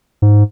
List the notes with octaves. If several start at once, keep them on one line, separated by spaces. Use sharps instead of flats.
G#2